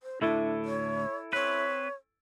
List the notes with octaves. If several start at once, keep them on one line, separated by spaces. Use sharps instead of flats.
C5
D2 A2 A3 D4 E4 A4
C#5
C4 B4 C#5